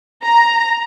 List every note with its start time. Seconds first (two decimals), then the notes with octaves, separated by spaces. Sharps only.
0.24 A#5